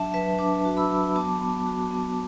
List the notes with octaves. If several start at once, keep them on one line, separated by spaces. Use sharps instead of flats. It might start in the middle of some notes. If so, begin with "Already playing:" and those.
Already playing: F#3 D4 E5 A5
F#3 B4 E5
D4 A5 D6
F#4
B5 E6
F#3
B3 A5 D6
B3
F#4
B3